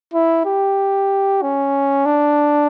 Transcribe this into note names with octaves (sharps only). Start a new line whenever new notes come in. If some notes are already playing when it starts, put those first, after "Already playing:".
E4
G4
C#4
D4